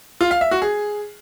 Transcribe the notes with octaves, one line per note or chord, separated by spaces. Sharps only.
F4
F5
E5
F#4
G#4